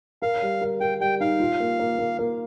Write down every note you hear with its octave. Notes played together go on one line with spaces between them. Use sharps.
A#4 F5
G3
A#4
A#4 G5
G3 G5
D#4 F5
F4
A#3
A#3
A#3
A#3